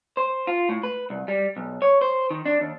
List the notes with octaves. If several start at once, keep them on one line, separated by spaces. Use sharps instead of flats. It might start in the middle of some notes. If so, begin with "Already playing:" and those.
C5
F4
A2
B4
C2
G3
B1
C#5
C5
D#3
D4
D#2